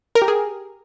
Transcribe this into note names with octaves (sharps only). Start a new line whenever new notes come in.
A#4
G4
G#4